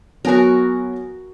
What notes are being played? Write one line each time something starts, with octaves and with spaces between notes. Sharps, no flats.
F#3 B3 F#4 A#4 G#5